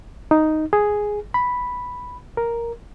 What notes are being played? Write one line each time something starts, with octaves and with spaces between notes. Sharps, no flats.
D#4
G#4
B5
A#4